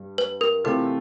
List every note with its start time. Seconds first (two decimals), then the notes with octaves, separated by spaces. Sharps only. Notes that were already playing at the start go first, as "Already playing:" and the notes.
Already playing: G2 G3
0.18 B4
0.41 A#4
0.65 C3 E3 A3 C4 F4 A4